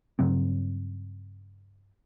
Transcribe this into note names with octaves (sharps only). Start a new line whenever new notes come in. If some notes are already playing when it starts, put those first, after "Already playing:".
G2 C#3 F#3 C4